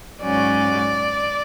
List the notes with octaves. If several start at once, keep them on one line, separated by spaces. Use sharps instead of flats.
G#2 F#3 C#4 D5